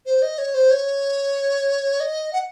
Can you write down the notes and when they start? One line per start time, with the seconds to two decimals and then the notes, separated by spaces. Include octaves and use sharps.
0.06 C5
0.22 D#5
0.38 C#5
0.54 C5
0.71 C#5
2.00 D#5
2.33 F#5